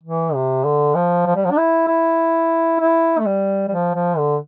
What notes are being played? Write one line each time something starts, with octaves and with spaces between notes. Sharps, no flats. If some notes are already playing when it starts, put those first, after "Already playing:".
E3
C3
D3
F3
F3
G3
F3
D4
E4
E4
E4
A3
G3
G3
F3
F3
D3